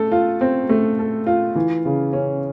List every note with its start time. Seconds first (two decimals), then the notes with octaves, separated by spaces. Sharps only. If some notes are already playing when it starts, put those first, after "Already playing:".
Already playing: A3 A4
0.12 F4
0.41 C4
0.69 A3
0.99 A4
1.26 F4
1.55 E3
1.85 C#3
2.13 C#4